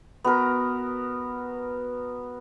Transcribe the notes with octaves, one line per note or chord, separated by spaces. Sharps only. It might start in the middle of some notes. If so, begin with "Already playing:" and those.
B3 F#4 A#4 B4